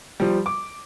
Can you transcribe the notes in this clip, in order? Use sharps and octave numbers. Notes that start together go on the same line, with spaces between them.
F3 G3
D6